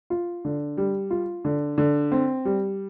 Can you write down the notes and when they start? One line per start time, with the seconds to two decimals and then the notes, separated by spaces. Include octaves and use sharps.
0.10 F4
0.45 D3
0.77 G3
1.11 F4
1.45 D3
1.78 D3
2.12 C4
2.45 G3